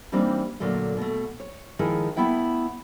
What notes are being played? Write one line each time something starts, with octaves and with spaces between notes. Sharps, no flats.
E3 G3 A#3 C4 D4 D#4
A#2 D3 F#3 A3
B2 A3
C#5
D#3 F3 G#3 E4 G#4
A3 B3 E4 E5 G5